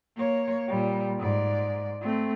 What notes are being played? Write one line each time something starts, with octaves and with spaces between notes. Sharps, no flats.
A#3 C#5
A#2 G3
G#2 D5
A3 C4